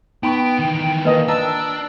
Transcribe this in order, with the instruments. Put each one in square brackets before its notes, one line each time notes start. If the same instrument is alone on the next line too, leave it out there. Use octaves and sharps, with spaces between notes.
[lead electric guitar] B3 [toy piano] D#4 B5 C#6 [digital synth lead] G5
[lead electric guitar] D#3 E3
[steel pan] A#3 D#5 [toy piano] B4
[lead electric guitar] D4 [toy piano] G5 A5 A#5 [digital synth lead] E6